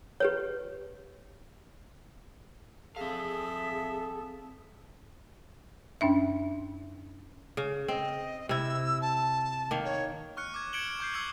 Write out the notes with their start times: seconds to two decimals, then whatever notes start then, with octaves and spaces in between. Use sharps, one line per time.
0.20 G4 B4 C#5
2.96 C4 G#4 A4 E5 F5
6.01 F#2 C#4 D4 E5
7.57 C#3
7.88 C4 D#5
8.49 C3 E4 E6
9.01 A5
9.71 D#3 A#3
9.84 C#5
10.37 C#6 F6 F#6 C#7
10.54 D6 G#6
10.73 G#6 C#7 D7 E7 F#7 G7
11.00 C#6 G6 C7
11.14 D6 E6 G#6 C#7 F#7